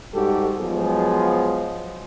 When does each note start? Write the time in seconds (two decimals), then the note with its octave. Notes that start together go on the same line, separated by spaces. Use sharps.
0.13 G#2 G3 F#4 G4 A4
0.60 F3 F#3 G#3 B3 G#4